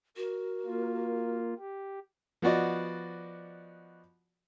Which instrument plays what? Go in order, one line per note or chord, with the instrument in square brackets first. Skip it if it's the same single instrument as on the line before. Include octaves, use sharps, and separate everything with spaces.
[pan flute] F#4 [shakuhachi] A#4
[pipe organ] A#3 F4
G4
[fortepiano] F3 B3 F#4 D5 D#5